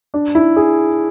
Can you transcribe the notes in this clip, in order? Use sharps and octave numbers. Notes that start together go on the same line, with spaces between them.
D4
E4
G#4